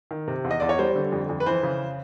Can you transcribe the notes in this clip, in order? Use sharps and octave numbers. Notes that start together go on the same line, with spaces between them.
D#3
C3
E2
D#5
E2 D5
C#5
G3 C5
D3
F2
F2
B4
E3 C5
C#3